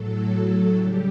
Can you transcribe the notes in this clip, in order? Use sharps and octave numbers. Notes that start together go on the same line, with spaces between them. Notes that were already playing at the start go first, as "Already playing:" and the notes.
Already playing: A2 F#3 A4
A4
C#3 G3 G4